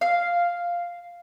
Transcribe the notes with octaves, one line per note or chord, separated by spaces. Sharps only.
F5